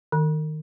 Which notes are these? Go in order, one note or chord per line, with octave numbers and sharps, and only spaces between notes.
D#3